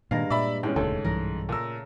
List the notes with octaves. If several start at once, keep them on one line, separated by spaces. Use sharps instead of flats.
G2 A#2 D#3 G#3 A#4 F5
A#2 D5 E5 B5
G#2 E3 G#3 C#4 G5
E1 D2 C#3 A4
B1 G2 E3 A#4
A#2 A3 A#4 E6